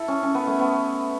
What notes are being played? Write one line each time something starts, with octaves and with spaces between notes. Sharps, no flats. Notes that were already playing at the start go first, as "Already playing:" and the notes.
Already playing: E4 A4
C#4
C#4
B3
A3
B3